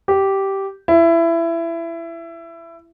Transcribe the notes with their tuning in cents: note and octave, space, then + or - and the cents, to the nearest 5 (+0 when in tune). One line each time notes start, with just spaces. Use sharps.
G4 -10
E4 +20